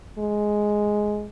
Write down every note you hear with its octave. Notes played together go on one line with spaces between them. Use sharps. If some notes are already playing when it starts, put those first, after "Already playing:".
G#3